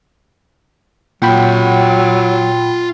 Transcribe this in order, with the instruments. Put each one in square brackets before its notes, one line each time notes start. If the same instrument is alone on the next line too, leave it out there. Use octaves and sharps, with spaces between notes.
[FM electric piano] A#2 G5 B5 [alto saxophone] F#3 [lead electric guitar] F4 F#5